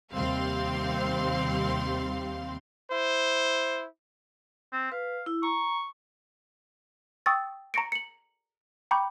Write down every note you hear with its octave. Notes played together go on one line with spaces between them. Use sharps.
D#2 C3 G3 C4 F5 C6
E4 C5
C4
B4 F5
E4
A#5 C#6
G5 C#6 D#6 E6 A6
A#5 C#6 A#6 C#7 D7
C#7 F#7
G5 A#5 B5 C#6 D6 G6